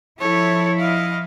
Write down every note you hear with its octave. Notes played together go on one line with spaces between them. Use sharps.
F3 E4 A4 C#5
D#5 F5